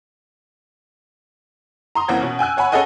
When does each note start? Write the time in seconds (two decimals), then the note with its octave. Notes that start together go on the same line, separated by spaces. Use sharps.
1.95 A#5 C6 D#6
2.08 F#1 E3 A#3 C4 F#5 G#6
2.21 B2 C#4
2.39 G5 G#5 E6 F#6
2.57 C#5 F#5 G#5 B5
2.72 C#4 G#4 A4 D#5 F#5 G#5